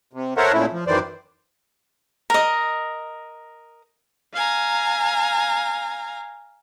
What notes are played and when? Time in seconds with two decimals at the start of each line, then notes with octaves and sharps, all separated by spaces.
0.13 C3
0.37 A4 A#4 C5 C#5 E5 F#5
0.53 A#2 C#3 A3 E4
0.72 F3
0.87 F#2 D#3 E3 C5 D5
2.30 A#4 D#5
4.34 F5 G#5 A#5